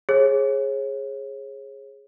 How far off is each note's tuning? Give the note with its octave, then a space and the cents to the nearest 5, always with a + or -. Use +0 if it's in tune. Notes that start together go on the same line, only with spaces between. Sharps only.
G#4 +0 C#5 -35